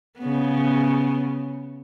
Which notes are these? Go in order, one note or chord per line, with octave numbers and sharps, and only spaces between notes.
C#3 B3